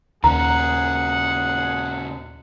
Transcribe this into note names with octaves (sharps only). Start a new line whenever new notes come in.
D#2 A#2 C#3 G#4 F#5 A#5